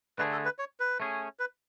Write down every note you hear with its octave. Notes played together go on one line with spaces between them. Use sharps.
D3 A3 D4 G#4 B4
A4
B4
C#5
B4
A3 C#4 G#4
B4